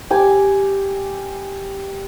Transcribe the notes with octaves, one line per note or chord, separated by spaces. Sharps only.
G4 G#5 D6